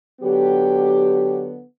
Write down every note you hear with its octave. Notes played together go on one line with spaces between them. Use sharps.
D3 F#3 B3 G4